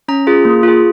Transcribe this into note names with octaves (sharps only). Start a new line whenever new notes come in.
C#4 A#5
F4 G#4
A#3
F4 G#4